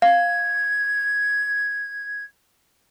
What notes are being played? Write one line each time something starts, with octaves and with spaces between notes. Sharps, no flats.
F5 G#6